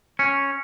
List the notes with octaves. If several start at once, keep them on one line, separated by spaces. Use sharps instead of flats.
C#4